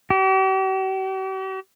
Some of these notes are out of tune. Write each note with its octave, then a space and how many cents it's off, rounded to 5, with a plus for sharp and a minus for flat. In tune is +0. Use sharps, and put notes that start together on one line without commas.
G4 -45